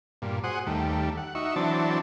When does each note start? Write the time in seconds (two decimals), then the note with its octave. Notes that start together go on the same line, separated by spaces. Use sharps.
0.22 G2 A#2
0.44 F#4 G#4 C5 F#5 D#6
0.67 D#2 G3 A3
1.17 F#5
1.35 D#4 F#4 E5 C#6
1.56 E3 F#3 C4 D4 A5